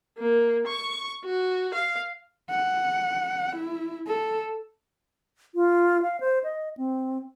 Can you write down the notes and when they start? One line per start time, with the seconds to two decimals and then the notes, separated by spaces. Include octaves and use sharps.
0.18 A#3
0.67 C#6
1.25 F#4
1.75 F5
2.50 F#5
3.56 E4
4.08 A4
5.55 F4
6.02 F5
6.20 C5
6.44 D#5
6.77 C4